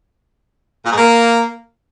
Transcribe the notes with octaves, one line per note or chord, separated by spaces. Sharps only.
A#2
G#2
A#3